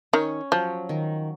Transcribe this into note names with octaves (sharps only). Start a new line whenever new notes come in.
D#3 C#4
F3 F#3
D#3